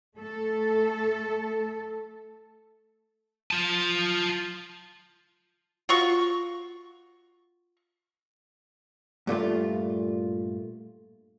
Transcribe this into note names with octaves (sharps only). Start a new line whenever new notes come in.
A3 A4
F4 A5
F4 F#4 C#6
G2 A#2 A3 F4